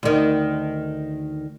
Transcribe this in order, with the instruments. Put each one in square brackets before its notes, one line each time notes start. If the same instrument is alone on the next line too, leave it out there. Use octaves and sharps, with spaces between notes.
[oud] D2 D#3